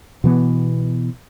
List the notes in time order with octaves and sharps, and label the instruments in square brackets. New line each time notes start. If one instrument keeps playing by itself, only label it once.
[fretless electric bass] B2 E3 B3